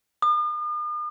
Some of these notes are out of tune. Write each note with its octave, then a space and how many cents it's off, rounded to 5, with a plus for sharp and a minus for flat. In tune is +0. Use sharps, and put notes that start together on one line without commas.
D#6 -45